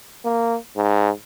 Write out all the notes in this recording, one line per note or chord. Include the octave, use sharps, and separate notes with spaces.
A#3
G#2